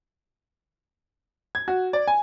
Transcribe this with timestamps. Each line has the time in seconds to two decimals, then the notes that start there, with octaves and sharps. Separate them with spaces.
1.55 G#6
1.68 F#4
1.93 D5
2.07 G#5